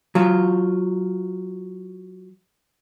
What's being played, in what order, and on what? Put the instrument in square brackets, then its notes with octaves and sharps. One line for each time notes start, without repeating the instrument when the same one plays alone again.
[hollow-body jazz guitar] F#3 F4